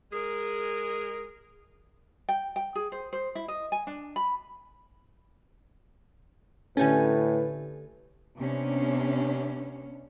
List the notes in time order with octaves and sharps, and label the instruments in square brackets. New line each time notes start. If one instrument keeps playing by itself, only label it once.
[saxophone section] G#3 G#4 A#4
[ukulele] G5
G5
G#4
C5
C5
E4
D#5
G#5
D4
B5
[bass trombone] A2 [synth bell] D3 G4 A4 [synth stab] C#4 G#5 [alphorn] B4
[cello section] C3 B3 C#4 D4